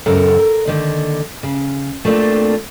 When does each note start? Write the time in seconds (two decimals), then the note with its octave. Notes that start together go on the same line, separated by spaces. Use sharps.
0.06 F#2 C#3 A4 A#4 F#5
0.39 A#4
0.66 D3 D#3 A#3
1.43 C#3
2.05 A3 A#3 C4 D4 F4